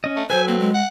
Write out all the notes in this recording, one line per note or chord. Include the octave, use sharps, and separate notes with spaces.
C#4 D#5
A3
F#3 A4 B4 C5 G#5
A#3 C4
G#3
F#5